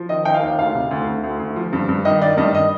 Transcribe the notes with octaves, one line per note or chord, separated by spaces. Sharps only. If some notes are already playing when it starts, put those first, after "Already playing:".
Already playing: F3
D#3 D#5
D#3 G5
F5
D#2
D2 F5
C3
D2
D2
D2
D2
F3
G2
G2
D#3 D#5
D#3 D5
G2 D#5
D#5